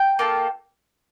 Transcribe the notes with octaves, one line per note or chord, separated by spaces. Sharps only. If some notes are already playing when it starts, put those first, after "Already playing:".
Already playing: G5
A#3 F4 A4